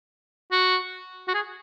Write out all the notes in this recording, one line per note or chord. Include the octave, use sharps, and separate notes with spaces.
F#4
F#4
G#4